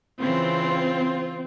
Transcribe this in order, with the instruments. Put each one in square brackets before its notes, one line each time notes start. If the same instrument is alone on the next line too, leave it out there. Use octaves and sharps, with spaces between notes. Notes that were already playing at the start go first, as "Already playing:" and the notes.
[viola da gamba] C#3 E3 [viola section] C4 [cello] F4